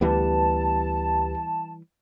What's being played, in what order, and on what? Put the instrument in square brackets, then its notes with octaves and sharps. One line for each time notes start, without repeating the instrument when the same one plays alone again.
[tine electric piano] D2 G4 B4 [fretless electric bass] E3 G3 B3 [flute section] A5